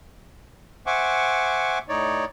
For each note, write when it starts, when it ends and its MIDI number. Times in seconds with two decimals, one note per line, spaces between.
0.86 1.79 72
0.86 1.79 76
0.86 1.79 78
0.86 1.79 80
0.86 1.79 85
0.86 1.79 86
1.89 2.25 45
1.89 2.25 63
1.89 2.25 73
1.89 2.25 74